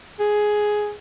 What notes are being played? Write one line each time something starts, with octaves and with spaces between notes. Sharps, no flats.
G#4